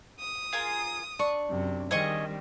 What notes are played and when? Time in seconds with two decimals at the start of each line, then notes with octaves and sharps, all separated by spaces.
0.20 D#6
0.53 F4 G#4 A#4
1.19 D4 C#6
1.49 F#2 C3
1.91 D#3 G3 C4 G#4 D#5 F5 C#6